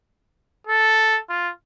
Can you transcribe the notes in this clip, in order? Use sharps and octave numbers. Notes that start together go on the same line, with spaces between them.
A4
F4